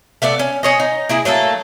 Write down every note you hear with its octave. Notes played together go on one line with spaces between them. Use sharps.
A3 B3 D5 E5
C#4
G#4 C#5 D#5
D#4
A#3 E4 G#4
F#3 A3 A#3 A4